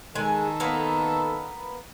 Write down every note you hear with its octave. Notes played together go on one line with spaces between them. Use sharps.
D#3 G#3 A4 G#5
A#3 B3 A#5